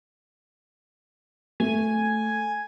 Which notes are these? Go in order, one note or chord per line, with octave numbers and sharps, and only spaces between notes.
A3 G#5